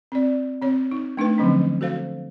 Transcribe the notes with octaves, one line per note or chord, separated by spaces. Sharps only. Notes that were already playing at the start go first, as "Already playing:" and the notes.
C4 D5
C4 C#5
D#4
A3 D4 D#4 B4
D3 F3 F#3 C4 C#4
F#4 A4 C5 F5